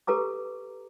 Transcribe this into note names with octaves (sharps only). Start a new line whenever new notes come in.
G4 A4 B4 A#5 D6